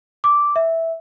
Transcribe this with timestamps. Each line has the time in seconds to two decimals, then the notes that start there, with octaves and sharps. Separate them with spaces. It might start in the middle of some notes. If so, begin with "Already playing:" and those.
0.24 D6
0.56 E5